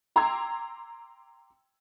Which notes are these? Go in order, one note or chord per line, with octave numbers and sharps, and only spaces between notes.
G5 A#5 C6 D6 E6 G#6